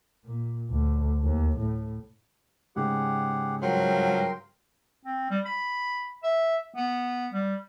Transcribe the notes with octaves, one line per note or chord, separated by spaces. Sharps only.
A#2
D2
D#2
A2
G#2 C#3 G4 G#4 F#5
G2 F3 F#3 A#4 G5 C6
C4
G3
B5
E5
B3
G3